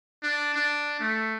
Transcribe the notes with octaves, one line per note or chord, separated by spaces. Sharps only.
D4
D4
A3